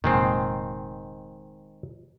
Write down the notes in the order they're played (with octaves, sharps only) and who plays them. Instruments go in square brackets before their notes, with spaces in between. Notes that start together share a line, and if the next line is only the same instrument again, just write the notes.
[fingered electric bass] F1 A#2 [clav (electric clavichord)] D#3 G#3 C4